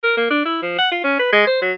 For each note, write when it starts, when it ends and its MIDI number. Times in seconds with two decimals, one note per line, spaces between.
0.04 0.17 70
0.17 0.28 58
0.30 0.43 62
0.45 0.57 64
0.62 0.77 53
0.78 0.87 78
0.92 0.99 65
1.04 1.18 61
1.19 1.30 71
1.32 1.45 56
1.47 1.60 72
1.62 1.72 54